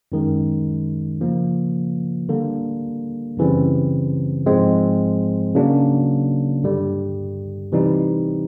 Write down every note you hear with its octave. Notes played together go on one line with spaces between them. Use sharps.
F#2 D#3 G#3
C#3 F3 A#3
D3 G3 A#3
F#2 C#3 E3 G3 C4
G#2 F3 G#3 C4
C#3 F#3 A#3 D4
G2 D3 G3
C3 E3 G3 C4 D#4